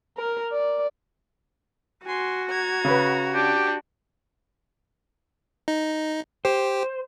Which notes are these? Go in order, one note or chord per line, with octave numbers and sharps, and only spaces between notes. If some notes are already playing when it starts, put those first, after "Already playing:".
A#4
D5
F#4 G#5 C6
A#5 G#6
C#3 B4
D4 G4
D#4
G4 C5